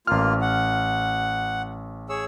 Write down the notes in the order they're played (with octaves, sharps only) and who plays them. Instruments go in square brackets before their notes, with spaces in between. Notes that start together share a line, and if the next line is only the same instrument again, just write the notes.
[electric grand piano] A1 F6 [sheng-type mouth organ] A#3 F4
[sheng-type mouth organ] F#5
G#4 C#5 E6